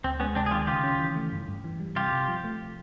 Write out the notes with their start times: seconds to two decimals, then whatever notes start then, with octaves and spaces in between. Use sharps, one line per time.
0.04 D2 C4
0.20 G#3 B3 C#4
0.35 C3 C4 D4
0.46 G#4
0.51 D#3 F4 G4
0.67 C#3 F4 G4
0.84 C#4
1.00 E3
1.16 A3
1.32 G2
1.48 G2
1.64 E3
1.80 G3
1.96 C3 F4 G4
2.12 C3
2.28 F3
2.44 A3